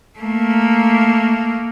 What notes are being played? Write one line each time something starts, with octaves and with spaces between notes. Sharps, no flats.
A3 A#3